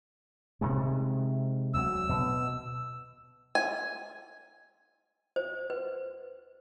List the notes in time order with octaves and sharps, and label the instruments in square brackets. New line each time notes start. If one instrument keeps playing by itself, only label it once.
[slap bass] C3 D#3 G#3
[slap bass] D2 F#3 [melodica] E6
[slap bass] B2
[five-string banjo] G#5
[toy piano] C5
B4